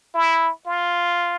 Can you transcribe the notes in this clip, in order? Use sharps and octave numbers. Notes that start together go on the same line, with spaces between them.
E4
F4